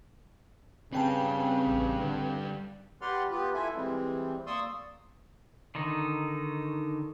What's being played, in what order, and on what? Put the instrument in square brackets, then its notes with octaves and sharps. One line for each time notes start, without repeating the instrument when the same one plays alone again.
[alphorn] C#3 [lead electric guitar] G3 B4 [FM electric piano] C4 G5 A5
[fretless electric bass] A1
D3
[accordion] G4 B4 D5 F#5 C6 F6
B3 F4 G4 B4
E4 F4 A4 E5 G#5
E3 G3 G#3 C4
A#3 D5 C6 C#6 D#6 E6
[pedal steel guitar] D3 D#3 D#4